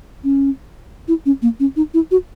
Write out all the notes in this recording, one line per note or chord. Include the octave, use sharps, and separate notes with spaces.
C#4
E4
C#4
A#3
C#4
D#4
E4
F#4